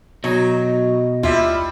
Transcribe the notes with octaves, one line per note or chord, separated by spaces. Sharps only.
B2 F#3 D#4
D#2 G3 E4 F4 E5